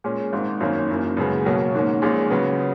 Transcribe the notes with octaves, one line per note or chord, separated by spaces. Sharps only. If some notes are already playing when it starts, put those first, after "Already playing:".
A#2 G#3 C#4
G#1 G#2 D#3
G#1 F#2 D#3 A#3 C#4
F#1 F#2 E3 A#3
F#2 C#3 G#3 B3
B1 B2 F#3 A#3 C#4
G#2 D#3 A#3 C#4
A#1 A#2 G#3 C#4
C#3 F#3 B3